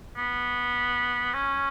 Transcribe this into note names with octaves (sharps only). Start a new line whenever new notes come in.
B3
C#4